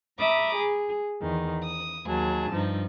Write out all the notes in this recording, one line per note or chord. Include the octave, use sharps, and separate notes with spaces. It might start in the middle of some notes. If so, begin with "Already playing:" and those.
E5 A#5 B5 D6 D#6
G#4
E2 D#3
D#6
D#2 F#3 G#4 A5
G2 F3 D#4